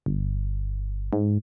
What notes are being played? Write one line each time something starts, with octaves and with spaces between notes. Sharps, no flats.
G1
G#2